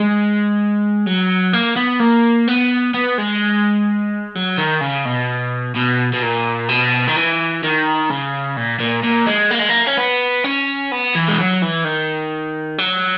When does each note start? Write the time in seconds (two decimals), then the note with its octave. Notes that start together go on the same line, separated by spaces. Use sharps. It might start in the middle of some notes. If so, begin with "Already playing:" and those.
Already playing: G#3
1.07 F#3
1.53 A#3
1.76 B3
2.00 A#3
2.48 B3
2.94 B3
3.18 G#3
4.35 F#3
4.58 D#3
4.81 C#3
5.06 B2
5.76 B2
6.13 B2
6.23 A#2
6.69 B2
7.08 D#3
7.16 E3
7.64 D#3
8.10 C#3
8.57 A#2
8.80 A#2
9.03 A#2
9.27 G#3
9.51 A#3
9.60 G#3
9.69 A#3
9.87 C#4
9.98 B3
10.44 C#4
10.92 B3
11.15 E3
11.28 G#3
11.38 F#3
11.62 E3
11.85 D#3
12.78 F#3